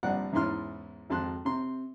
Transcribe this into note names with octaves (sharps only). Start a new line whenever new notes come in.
A#1 G2 C4 D5 F#5
E2 G#2 C#4 E4 C6 F6
G#1 F2 A5 C6 F#6
C3 C4 C6